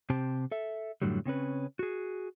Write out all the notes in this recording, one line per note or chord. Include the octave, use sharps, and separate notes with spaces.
C3 C4 G4 C5 G5 A5
A4 E5
F#2 A2 D3 F#3 G3
C#3 C4 C#4 B4
F#4 G#4